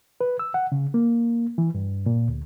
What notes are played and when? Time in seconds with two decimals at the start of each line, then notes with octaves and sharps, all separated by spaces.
0.21 B4
0.39 E6
0.54 F#5
0.72 C#3
0.94 A#3
1.58 E3
1.75 G2
2.06 A#2
2.28 D2